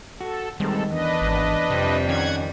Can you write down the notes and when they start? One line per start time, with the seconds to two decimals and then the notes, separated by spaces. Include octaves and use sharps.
0.21 F#4 A4
0.60 D#3 G3 G#3 C4 A4
0.90 E2 D4 B4 D#5
1.22 G#1
1.70 F2 C3 G3
2.09 D#3 C#4 F#5 G#6